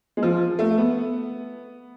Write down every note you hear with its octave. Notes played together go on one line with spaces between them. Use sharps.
G#3
F3
A3
B3